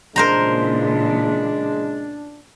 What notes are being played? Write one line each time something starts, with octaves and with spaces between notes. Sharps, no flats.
A#2 C#3 E3 G#3 D4 A#4 C5 A#5